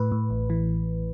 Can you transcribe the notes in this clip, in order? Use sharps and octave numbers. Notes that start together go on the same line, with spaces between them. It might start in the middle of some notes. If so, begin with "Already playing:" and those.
Already playing: A2 B4
A2
A1
E3